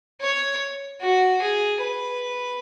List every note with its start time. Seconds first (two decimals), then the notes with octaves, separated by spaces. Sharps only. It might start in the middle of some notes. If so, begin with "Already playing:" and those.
0.21 C#5
1.01 F#4
1.42 G#4
1.81 B4